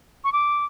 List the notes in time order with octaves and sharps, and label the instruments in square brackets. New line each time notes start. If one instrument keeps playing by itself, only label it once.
[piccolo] C#6
D6